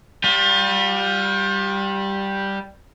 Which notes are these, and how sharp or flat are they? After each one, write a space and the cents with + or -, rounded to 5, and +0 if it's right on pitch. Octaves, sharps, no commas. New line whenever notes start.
G3 +0 F4 +40